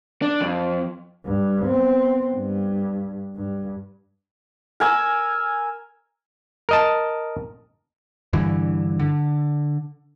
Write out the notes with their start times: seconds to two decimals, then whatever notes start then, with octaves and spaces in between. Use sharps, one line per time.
0.22 D4
0.41 F2
1.26 G2
1.65 B3 C4
2.34 G2
3.36 G2
4.80 A#4 G#5 E6
6.69 A#4 D#5 A5
8.33 G2 D3 E3
8.99 D3